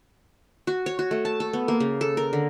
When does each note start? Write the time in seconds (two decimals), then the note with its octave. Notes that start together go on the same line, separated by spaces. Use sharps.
0.67 F#4
0.86 C#5
0.99 F#4
1.11 A3
1.25 A5
1.40 A4
1.53 B3
1.68 A#3
1.80 C#3
2.01 A4
2.17 A#4
2.33 D3